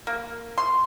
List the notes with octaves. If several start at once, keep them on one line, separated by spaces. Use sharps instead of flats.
A#3
C6